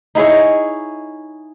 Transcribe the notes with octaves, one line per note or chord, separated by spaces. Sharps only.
D#4 E4 G#4 C#5